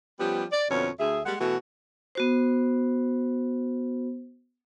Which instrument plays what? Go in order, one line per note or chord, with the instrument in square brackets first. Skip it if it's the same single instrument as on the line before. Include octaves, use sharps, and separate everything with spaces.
[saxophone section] F3 G3 B3 C#4 G4
D5
F2 B2 D3 F3 C#4 C#5
D2 G#4 E5
G3 G#3 A#3 F#5
B2 E3 A3 E4 F#4
[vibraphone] B3 F#4 C5